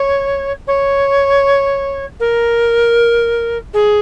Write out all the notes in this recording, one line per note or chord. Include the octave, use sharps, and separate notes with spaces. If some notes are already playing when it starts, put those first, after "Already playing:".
Already playing: C#5
C#5
A#4
G#4